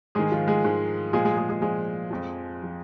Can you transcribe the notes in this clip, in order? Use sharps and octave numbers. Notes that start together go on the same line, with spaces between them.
G#2 D#3 G#3 G#4
F3 F4
G#3 G#4
G#2 D#3
A#2 F3 G#3 G#4
G#3 G#4
G#3 G#4
G#3 G#4
A#2 F3 G#3 G#4
F2 F3
F3